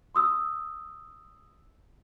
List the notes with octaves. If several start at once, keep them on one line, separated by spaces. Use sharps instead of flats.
C6 D#6 E6